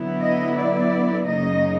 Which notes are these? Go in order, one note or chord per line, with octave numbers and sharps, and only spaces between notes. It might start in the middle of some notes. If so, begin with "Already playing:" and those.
Already playing: D3 F#3 B3 E4
D#5
D5
F#2 C#3 F#3 A#3 D#4 D#5